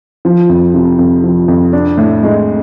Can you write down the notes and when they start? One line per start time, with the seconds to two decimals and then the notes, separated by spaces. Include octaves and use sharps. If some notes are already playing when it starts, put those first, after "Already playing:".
0.25 F3
0.49 F2
0.74 C3
0.99 F2
1.24 F3
1.48 F2
1.73 D4
1.98 A2
2.23 G#3